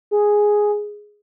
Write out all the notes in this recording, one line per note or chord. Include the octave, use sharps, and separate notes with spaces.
G#4